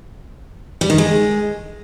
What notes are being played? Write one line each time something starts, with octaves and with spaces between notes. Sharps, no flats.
G3
D#3
G#3